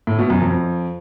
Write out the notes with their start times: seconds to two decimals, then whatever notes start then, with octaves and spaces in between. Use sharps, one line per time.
0.07 A2
0.19 B2
0.30 F#2
0.41 F2